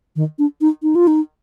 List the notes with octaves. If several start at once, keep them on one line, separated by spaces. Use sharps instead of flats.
D#3
D4
D#4
D#4
F4
D#4